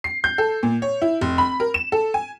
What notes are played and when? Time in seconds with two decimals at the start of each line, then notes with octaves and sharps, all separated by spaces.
0.04 C7
0.24 G6
0.38 A4
0.63 A#2
0.82 C#5
1.02 E4
1.21 F1
1.38 B5
1.60 A#4
1.74 E7
1.92 A4
2.14 G#5